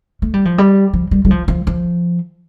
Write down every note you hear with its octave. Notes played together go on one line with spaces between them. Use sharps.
A3
G3
F3
G3
F3
G3
G3
F3
F3
F3